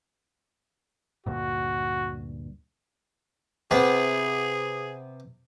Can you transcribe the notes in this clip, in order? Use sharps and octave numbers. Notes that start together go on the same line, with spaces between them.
D2 G2 A#2 F#4
C3 B3 G#4